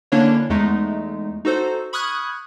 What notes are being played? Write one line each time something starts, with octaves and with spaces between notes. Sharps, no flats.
D3 A#3 C#4 D4 E4 C#5
E2 G#3 A3 D#4
D#4 F#4 A4 C5
B5 C#6 D#6 F6 F#6 G#6